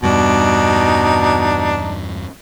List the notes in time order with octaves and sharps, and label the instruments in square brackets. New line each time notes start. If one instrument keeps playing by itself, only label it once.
[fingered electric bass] E2 G2 G3 [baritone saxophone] B2 [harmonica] D4 D#4